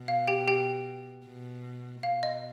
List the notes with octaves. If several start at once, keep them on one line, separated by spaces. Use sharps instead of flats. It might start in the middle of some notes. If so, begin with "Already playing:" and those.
Already playing: B2
F5
G4 G5
G4 G5
B2
B2 F5
D#5